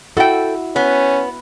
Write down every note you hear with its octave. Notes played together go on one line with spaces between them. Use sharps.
E4 F#4 A4 G5
B3 C#4